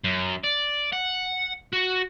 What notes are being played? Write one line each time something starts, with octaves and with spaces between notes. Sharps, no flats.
F#2
D5
F#5
F#4